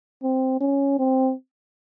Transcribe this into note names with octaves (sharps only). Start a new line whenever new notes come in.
C4
C#4
C4